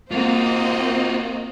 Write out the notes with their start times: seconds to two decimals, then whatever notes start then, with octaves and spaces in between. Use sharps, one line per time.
0.11 A#3 C4 F4 F#4 C5 D#5